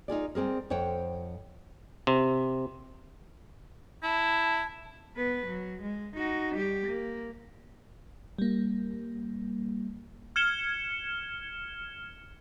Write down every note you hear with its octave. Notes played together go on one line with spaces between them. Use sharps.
D#4 F4 G#4 D5
G3 C4 G#4 A#4
F2 C5 C#5 F#5 G5
C3
E4 A5
B3 B4
F#3
G#3
D#4 F#4
G3 G4
A#3
G3 A#3
F6 G#6 C#7 E7 G7